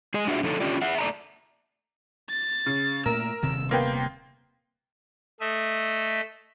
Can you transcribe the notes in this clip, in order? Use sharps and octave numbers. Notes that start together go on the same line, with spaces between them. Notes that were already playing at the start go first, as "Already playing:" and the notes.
G#3 G#4 D#5 G#5
D4 F4 F#4 G#4 E5
D3 F3 A3 D#4 A4 C#5
C#4 D4 F4 G4 D5
G#4 E5 F#5
A3 D5 A5 A#5
A6
C#3
A#2 A3 A#4 E6
D#1 C3 D#3 E6
A#3 B3 G5 C6
A3 D#5 E5